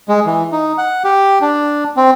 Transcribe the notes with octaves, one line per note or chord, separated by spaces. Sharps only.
G#3
E3
D#4
F#5
G4
D4
C4